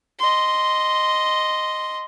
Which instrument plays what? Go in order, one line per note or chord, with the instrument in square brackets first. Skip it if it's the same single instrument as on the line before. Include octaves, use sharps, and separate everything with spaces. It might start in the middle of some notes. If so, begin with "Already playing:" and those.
[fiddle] D#5 C6